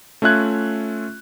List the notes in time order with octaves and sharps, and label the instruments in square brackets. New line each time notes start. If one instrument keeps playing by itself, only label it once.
[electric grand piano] A3 C#4 F4 E5 F#6 G#6